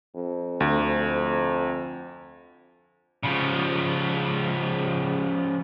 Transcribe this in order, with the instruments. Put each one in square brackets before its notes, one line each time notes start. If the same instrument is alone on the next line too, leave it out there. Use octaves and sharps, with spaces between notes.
[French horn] F2
[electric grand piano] D2
[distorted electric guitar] C#3 F3